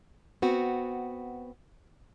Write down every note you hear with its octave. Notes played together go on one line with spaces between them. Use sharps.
B3 C4 F#4